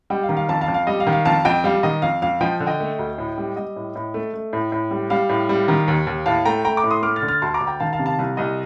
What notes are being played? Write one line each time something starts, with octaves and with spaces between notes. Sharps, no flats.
G3 D#5 G5
F5
D#3
F5
F2 F5 A5
F5 A5
F2
F5
G3 D#5
F5
D#3
F5
F2 F5 A5
F2 D#5 G5
G3 F5
D#3 D#5
F2 F5
F2 F5
F3 D#5 G5
D3
D#5 G5
A3
D2
A2
G3
G3 D#5
A2
A2
A3
A3
A2
A2
G3
G3 F5
A2
G3
D#3
D#2
D#2
A2 F5 A5
A3 G5 A#5
A3 G5 A#5
A#5 D6
A2
C6 D#6
A3 D6 F6
F6 A6
D3
F6 A6
D2 A5 C6
A#5 D6
D2
G5 A#5
D#3 F5 A5
F5 A5
C3
F5 A5
C2 F5
C2 D#5